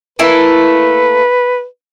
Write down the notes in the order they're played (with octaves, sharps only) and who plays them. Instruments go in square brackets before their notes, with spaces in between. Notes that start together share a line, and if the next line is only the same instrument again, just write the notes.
[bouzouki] A3 A#3 E4 [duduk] B4